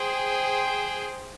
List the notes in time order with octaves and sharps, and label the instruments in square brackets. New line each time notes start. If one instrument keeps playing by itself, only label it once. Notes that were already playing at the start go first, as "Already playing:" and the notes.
Already playing: [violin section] G#4 C5 G5